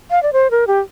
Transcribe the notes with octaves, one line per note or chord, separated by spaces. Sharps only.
F5
D5
C5
A#4
G4